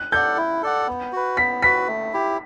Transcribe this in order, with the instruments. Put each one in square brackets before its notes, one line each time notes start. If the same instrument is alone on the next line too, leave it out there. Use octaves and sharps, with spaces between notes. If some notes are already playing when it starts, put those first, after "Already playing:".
Already playing: [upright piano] F#6
[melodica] A4 D5 F#5 [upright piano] G6
[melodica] E4
A4 D5 F#5
B3
F#4 B4
[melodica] B3 [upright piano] B6
[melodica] F#4 B4 [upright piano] B6
[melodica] A3
E4 G4